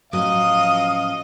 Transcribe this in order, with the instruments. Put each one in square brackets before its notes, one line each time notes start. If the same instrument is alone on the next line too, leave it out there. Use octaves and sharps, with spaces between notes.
[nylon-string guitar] A2 F#3 C#4 [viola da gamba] F3 D#5 [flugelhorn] F5 [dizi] D#6